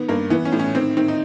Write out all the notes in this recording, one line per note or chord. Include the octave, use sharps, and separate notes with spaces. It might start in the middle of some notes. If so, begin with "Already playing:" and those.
Already playing: D#3 B3
G2 A#3
E3 B3
C#4
A2
C#4
D#3 C4
D#3 C4
D#4